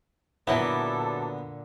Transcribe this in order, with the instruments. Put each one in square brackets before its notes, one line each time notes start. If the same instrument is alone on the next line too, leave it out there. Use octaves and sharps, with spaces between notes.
[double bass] A#2 D3 [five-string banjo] E3 F#3 E4 [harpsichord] B3 [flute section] A4 D6